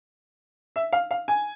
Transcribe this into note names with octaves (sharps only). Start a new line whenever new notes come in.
E5
F5
F5
G#5